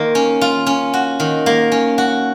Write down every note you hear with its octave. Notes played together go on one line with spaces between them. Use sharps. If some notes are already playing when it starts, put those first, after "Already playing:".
Already playing: D#3 A#3 F4
C#4
F4
C#4
F#4
D#3
A#3
C#4
F#4